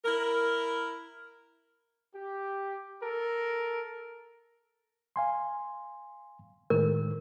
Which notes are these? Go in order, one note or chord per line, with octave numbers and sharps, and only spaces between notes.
E4 A#4
G4
A4 A#4
F5 G#5 C6
A2 D#3 G#3 A#4